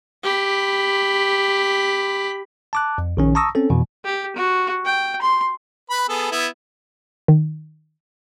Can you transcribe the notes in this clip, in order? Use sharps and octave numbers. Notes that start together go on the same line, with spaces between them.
G4 B5
A5 D6 F#6
F2
A#1 D#3 C#4
A5 A#5 C#6 D#6 E6 A#6
C4 C#4 A4
F2 B2 E3
G4
F#4
G5
C6
B4 B5
B3 G#4 A4
B3 E4
D#3